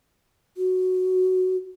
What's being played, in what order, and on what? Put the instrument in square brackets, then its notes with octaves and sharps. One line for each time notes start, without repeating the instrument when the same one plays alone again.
[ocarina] F#4